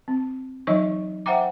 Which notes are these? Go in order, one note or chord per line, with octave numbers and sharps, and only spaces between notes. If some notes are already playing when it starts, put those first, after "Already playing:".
C4
E3 F#3 D#4 C#5 D#5 C#6
C5 E5 F#5 G5 A#5 D6